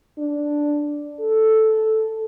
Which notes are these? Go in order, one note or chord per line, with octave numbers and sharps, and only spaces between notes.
D4
A4